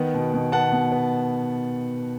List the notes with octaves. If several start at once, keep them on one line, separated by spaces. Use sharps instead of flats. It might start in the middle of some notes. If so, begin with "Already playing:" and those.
Already playing: D#3 B3 F#5
B2
B2
B3 F#5 A5
B2
B3